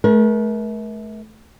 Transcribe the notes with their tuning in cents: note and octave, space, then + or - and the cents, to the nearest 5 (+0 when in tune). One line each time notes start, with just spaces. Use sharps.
A3 -35 A#4 +35